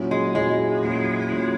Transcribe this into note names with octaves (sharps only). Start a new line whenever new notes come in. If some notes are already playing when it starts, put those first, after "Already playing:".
Already playing: A#2 F#3 C#4 E4
G#3
A#2 F#3 G#3 C#4 E4
A#2 F#3 C#4 E4
A#2 F#3 C#4 E4